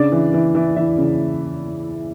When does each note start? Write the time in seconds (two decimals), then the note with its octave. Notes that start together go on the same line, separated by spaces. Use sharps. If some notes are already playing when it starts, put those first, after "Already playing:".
Already playing: C#3 D4 D5
0.12 E3
0.34 E3
0.55 E3
0.76 E3 E4 E5
0.98 C#3